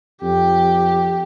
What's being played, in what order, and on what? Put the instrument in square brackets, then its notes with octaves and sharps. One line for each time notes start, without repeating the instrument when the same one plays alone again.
[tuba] F2 [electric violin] G4